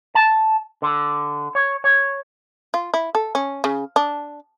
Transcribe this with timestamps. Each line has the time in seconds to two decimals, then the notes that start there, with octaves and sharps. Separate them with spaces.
0.15 A5
0.82 D3
1.55 C#5
1.84 C#5
2.74 F4
2.94 E4
3.15 A4
3.35 C#4
3.64 C#3
3.96 D4